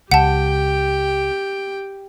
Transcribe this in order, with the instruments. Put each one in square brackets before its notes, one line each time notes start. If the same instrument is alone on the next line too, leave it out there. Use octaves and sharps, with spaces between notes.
[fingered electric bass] C#2 [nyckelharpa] G4 G5 [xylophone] F#5 A5